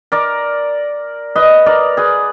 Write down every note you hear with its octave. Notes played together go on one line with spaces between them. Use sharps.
A#4 D5
B4 D#5
A#4 D5
G#4 B4